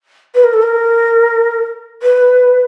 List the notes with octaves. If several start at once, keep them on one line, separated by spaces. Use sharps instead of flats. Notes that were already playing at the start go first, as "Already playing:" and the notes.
B4
A#4
A4
A#4
B4